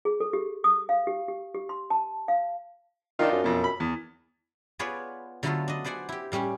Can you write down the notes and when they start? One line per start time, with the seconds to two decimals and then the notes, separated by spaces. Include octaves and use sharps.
0.05 G#4
0.20 A4
0.33 G4
0.64 D#6
0.89 F5
1.07 G4
1.28 G4
1.54 G4
1.69 C6
1.90 A5
2.28 F5
3.19 D#3 D4 D#4 F4
3.32 F#2
3.44 F2 B2
3.64 B5
3.80 E2
4.79 B3 F4 G#4 B4 C#5 D5
5.43 D3 F#3 A3 B3 F4 A4
5.68 D4 D#5
5.84 B4 C5 D5 F#5 G#5
6.09 E4 G4
6.32 A2 G3 C#4 G4